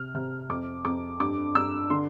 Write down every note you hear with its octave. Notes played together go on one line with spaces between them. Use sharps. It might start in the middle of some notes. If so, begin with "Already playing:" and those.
Already playing: C3 F6
C3 F6
F2 D6
F2 D6
G2 D6
G2 E6
D3 C6